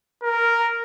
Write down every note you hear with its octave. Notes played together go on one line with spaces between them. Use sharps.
A#4